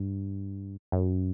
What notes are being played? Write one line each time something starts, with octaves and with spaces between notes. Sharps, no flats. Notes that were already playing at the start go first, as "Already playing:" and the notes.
Already playing: G2
F#2